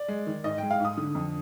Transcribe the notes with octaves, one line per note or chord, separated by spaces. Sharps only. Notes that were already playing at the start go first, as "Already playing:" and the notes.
Already playing: D5
G#3
D#3
G#2 D#5
G#3 G5
F5
G#2 D#6
D3
F2